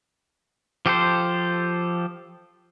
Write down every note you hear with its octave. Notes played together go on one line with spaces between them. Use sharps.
F3 G4 A4 C5